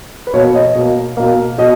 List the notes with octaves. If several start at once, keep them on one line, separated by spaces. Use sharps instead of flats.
B4
B2 A#3 C#5
C#5
D#5
B2 A#3
B2 A#3
B2 D#5